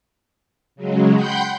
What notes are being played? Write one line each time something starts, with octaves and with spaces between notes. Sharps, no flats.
C#3 F#3 G#3
F#5 G5 B5 C6 G6